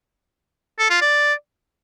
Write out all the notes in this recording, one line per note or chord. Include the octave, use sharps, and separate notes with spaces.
A4
F4
D5